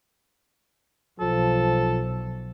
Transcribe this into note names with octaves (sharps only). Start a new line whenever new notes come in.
B1 F3 A4